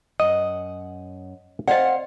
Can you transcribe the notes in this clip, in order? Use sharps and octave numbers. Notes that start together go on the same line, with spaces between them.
F#2 D#5 F#5
C4 C5 D5 D#5 F5 F#5